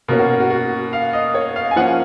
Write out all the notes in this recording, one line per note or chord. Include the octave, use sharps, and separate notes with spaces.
B2 A#3 C#4 A#4
F#4
F#4
F#4
F5
D#5
C#5
F5
G#5
F3 A#3 C#4 F#5